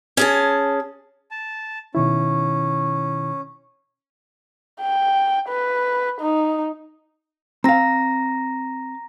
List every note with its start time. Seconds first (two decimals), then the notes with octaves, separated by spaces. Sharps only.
0.17 C#4 G#4 A5
1.31 A5
1.95 B2 D#3 C#4 E4
4.82 G5
5.49 B4
6.21 D#4
7.64 C4 F5 A#5 A#6